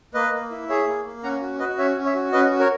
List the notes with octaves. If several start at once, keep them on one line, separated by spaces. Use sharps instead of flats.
A#3 B4 D#5
A#3
E4
G#4 C#5 E5
A#3
A#3
C#4 F#5 A#5
F#4
F#4 B4 D#5
C#4 C#5 E5
C#4
C#5 E5
F#4
C#4 B4 D#5
F#4
A#4 C#5